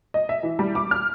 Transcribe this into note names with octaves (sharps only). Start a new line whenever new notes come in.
D#5
E5
E3
G3
D6
F6